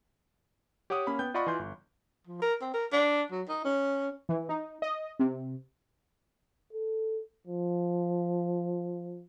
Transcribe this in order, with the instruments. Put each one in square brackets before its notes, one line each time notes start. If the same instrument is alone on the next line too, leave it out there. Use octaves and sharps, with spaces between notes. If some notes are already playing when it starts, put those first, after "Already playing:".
[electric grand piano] G4 C#5 F#5 D6 D#6
A#3 C#4 B5
B3 G5 G6
F4 D5 D#5 F#5 B5 C#6
E3 F4 G#5 C6 G6
G1
[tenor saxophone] F3
A#4
C4
A#4
D4
F#3
D#4
C#4
[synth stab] E3
D#4
D#5
C3
[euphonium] A4
F3